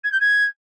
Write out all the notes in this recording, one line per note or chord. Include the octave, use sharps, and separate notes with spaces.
G#6
G6
G#6